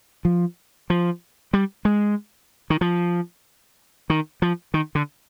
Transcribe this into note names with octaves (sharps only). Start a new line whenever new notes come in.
F3
F3
G3
G#3
D#3
F3
D#3
F3
D#3
D3